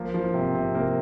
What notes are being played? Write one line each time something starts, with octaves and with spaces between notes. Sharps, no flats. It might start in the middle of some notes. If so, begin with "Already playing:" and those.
Already playing: F3 A#3
F3
C3
C3
A#3